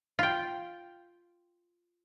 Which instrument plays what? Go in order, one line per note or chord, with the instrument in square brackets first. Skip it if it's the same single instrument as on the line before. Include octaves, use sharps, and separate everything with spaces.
[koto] F4 G5